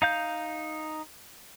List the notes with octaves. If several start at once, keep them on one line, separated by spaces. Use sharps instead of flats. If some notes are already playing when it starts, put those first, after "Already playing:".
D#4 F5 G6